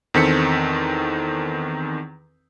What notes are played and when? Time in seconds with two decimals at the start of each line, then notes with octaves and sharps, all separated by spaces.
0.14 E2 D#3 C4 A4 B6 C#7